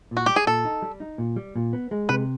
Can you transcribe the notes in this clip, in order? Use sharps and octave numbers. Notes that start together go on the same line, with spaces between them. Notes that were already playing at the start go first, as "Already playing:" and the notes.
A#2
F#4
G3 G4
G#4
A#2 A4
D#4
G3
D#4
A#2
G3
A#2
B3
G#3
C3 B4